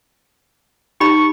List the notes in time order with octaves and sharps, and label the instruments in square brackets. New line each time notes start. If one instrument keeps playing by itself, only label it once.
[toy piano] D#4 G4 B5 [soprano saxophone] C#6